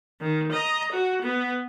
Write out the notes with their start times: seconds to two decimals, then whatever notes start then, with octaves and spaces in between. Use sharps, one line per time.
0.21 D#3
0.52 D#5 A#5
0.92 F#4
1.22 B3